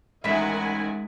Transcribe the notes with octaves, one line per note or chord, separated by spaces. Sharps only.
A1 D#3 G#3 E5 F#5 G#5 B5 B6